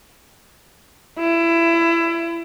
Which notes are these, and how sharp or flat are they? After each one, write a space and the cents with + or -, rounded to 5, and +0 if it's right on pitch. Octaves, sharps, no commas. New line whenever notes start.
E4 +25